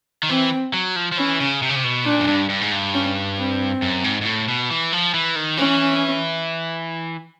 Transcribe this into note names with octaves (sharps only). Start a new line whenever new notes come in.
D#3
E3 C4
F#3
F3
F3
E3 C#4
C#3
C3
C#3
C3
B2
A#2 D4
F#2
G2
G2
G#2
G2
C#4
C4
F#2
G#2
G#2
A2
B2
E3
F3
E3
D#3
E3 C#4